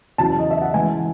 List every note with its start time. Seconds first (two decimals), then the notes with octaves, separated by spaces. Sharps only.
0.18 E2 C#3 F#3 A5
0.39 D#5
0.51 E5
0.62 F#5
0.74 C#3 E3 G#3 B3 G#5